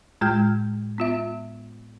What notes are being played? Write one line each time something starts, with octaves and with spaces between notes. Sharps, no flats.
A2 G#3 F4 G5 F6 G6
B3 F4 E5